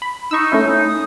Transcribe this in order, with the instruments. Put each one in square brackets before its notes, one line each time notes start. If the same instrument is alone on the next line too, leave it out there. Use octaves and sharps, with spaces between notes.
[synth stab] B5
[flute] D#4 [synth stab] C#6 E6
[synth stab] A3 C#4 E4
[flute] D#6